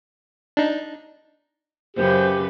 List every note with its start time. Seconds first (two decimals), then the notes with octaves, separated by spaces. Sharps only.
0.57 D4 D#4
1.96 F#2 C#3 G4 B4 C5